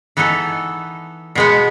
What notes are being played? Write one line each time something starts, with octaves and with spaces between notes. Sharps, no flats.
E3 B3 D#4 A4
B2 G#3 B3